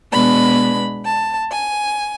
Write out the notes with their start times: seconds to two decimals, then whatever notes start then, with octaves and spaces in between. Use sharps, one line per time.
0.12 B2 G#3 B3 D4 B5
1.04 A5
1.51 G#5